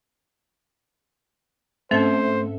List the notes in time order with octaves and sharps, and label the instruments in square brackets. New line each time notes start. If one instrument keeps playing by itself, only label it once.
[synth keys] G#2 A4 E5 [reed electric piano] A3 [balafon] C4 C#4 [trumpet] C5